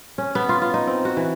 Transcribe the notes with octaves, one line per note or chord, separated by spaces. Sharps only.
C#4
B3
F4
F4
D#4
C4
F#4
E3